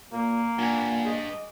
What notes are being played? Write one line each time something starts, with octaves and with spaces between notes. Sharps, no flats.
A#2 A#3
G2 A#2 F#5 G#5 G#6
G#4 D#5